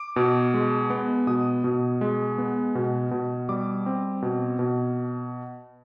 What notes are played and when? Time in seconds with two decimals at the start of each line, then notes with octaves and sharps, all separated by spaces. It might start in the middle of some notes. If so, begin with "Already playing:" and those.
Already playing: D6
0.16 B2
0.54 G#3
0.90 B3
1.27 B2 D#6
1.64 B2
2.01 G#3
2.38 B3
2.75 B2
3.11 B2
3.49 G3 D6
3.86 C4
4.22 B2
4.59 B2